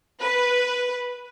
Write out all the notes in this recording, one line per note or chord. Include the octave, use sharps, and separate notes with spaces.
B4